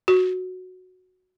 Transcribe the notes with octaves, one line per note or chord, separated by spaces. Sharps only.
F#4